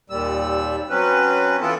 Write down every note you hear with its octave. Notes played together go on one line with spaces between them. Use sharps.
D#2 A#2 G3 E6
F#3 C4 C#4 B4
E3 B3 E4 F4 A4 A5